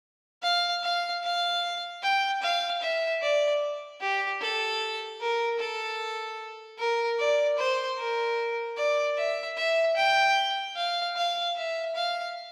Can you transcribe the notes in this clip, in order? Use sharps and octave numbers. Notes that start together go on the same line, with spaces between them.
F5
F5
F5
G5
F5
E5
D5
G4
A4
A#4
A4
A#4
D5
C5
A#4
D5
E5
E5
G5
F5
F5
E5
F5